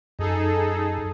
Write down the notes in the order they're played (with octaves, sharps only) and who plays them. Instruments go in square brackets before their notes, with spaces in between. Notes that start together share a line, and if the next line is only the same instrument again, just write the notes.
[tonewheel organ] F#2 [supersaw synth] D#4 G#4 A4